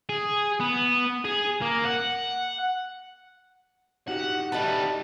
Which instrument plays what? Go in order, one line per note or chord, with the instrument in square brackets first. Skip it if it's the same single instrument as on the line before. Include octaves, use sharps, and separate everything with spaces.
[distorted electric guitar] G#4
B3
G#4
A#3
F#5
[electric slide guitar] D#4 F#4 G4 [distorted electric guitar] F#5
[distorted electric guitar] G3 B3 [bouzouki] D#5 E5 A5